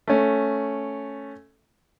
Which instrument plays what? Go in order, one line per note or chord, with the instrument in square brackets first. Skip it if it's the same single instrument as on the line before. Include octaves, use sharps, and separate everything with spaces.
[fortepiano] A3 C#4